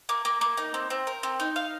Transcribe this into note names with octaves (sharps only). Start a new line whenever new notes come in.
A#3
A#3
A#3
D#4
C4
C4
A#4
C4
D#4
F5